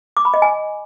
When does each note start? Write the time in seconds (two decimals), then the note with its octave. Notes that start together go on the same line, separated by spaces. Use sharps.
0.17 D6
0.25 B5
0.34 D#5
0.42 G#5